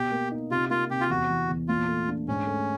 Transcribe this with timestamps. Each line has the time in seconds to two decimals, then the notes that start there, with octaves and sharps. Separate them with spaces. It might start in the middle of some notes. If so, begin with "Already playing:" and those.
Already playing: B2 G4
0.11 A#3
0.31 D#4
0.51 C3 F4
0.70 A#3 F4
0.90 C3 G4
1.01 F4
1.10 E2 F#4
1.30 E3
1.49 E2
1.68 A#2 F4
1.89 A3
2.08 D4
2.28 G#2 C#4
2.47 A3